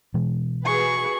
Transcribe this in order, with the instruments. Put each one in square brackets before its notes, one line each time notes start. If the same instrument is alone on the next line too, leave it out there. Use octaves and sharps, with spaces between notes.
[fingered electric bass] B2 E3 G#3
[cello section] F#4 G#4 B4 [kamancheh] C#6